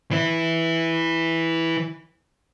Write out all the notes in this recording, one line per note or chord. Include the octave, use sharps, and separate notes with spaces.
E3 E4